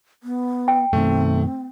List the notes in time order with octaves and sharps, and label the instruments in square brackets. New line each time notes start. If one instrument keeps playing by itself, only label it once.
[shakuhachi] B3
[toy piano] G5
[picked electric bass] F#2 B2 D#3 [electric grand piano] A3 [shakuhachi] C4